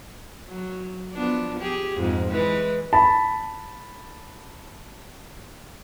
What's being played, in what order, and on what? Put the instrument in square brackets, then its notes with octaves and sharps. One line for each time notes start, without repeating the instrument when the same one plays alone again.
[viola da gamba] F#3
F3 B3 D4
G4 G#4
F2 G#2
E3 G#3 B4
[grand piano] A5 B5